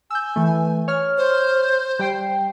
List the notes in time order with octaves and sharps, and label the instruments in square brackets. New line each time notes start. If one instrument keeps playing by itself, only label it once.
[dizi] G#5 [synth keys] E6 G6
[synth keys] E3 A3
C#5 F6
[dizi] C5
[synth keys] G3 G5 C7